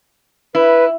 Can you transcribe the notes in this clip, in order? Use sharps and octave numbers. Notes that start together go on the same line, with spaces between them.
E4 B4